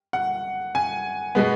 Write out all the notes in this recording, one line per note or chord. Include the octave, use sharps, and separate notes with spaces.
F#5
G#5
B2 G#3 B3